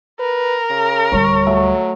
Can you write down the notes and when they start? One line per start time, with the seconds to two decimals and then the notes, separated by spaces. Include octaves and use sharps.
0.20 A#4 B4
0.70 C#3
1.12 D1 G3 C#5
1.46 F#3 A3